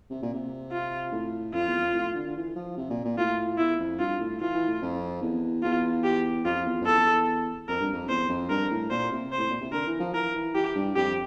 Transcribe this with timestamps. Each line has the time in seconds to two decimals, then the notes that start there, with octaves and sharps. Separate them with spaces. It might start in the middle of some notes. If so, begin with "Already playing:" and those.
0.10 C3
0.22 A#2
0.33 C3
0.72 F4
1.12 A2
1.54 F2 F4
1.68 E2
1.81 F2
1.94 A2
2.15 D3
2.28 D3
2.36 E3
2.56 F3
2.77 C3
2.90 A#2
3.05 A#2
3.17 A2 F4
3.58 E2 E4
3.79 F2
3.99 G2 F4
4.20 A2
4.41 E3 F4
4.54 E3
4.68 A2
4.82 F2
5.22 E2
5.63 E2 F4
6.04 G4
6.45 F2 F4
6.66 E2
6.82 F2
6.86 E2 A4
7.69 F2 A#4
7.80 G2
7.93 F2
8.08 E2 C5
8.29 F2
8.49 G2 A#4
8.71 A2
8.91 A#2 C5
9.12 C3
9.32 C5
9.38 A2
9.50 A#2
9.61 C3
9.72 D3 A#4
9.87 E3
10.00 F3
10.14 E3 A#4
10.34 E3
10.55 E3 G4
10.75 G2
10.96 F2 G4